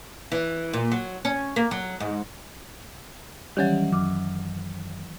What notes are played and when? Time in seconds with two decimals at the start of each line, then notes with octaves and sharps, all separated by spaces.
0.32 E3
0.73 A#2
0.92 F#3
1.25 C#4
1.56 A#3
1.71 F#3
2.00 G#2
3.57 D#3 E3 F#3 G3 C#4
3.92 F#2 D6